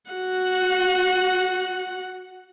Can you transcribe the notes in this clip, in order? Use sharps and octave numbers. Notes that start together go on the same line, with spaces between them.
F#4 F#5